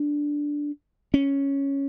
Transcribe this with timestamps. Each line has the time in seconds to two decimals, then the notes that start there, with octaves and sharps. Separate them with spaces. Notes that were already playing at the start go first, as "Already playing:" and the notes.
Already playing: D4
1.14 C#4